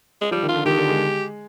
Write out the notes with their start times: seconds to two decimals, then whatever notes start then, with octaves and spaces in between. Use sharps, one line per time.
0.21 G#3
0.31 F3 G3
0.43 D#3
0.48 F4
0.55 D3
0.65 D#3 G4
0.77 D3
0.88 G#3